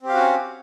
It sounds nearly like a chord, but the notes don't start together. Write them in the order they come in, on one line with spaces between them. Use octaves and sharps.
C4 G4 F5 F#4 C#4